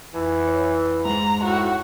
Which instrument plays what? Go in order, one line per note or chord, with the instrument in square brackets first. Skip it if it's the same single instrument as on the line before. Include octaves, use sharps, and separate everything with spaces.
[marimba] F2 [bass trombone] E3
[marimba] C#5
[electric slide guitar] G#2 G#3 [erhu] A#5
[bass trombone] A2 [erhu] F#4